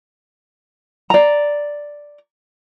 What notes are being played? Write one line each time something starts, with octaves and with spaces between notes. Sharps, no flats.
D5 A#5